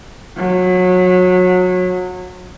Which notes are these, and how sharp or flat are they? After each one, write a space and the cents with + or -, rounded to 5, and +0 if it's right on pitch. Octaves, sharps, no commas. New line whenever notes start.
F#3 -25